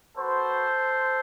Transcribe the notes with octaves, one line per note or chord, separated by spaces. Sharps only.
B3 F#4 A4 C5